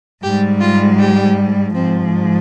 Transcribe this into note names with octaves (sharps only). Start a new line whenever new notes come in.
G#2 G3 G4
F4
G4
G#2 F3 C4